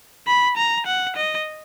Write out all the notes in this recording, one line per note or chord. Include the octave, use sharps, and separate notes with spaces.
B5
A#5
F#5
D#5